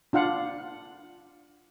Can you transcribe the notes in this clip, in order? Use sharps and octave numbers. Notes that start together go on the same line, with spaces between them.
D4 F4 F5 F#5